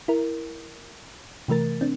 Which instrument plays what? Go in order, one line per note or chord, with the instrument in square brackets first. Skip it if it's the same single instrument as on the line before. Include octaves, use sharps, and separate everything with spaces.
[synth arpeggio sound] E4 A#4
C3 E3 A3 A#4 A6
C4 D4